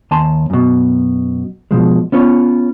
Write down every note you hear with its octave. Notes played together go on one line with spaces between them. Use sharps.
D#2 G#5 A5 C6
F#2 B2
B2 F3 G#3
B3 C#4 F4 C#5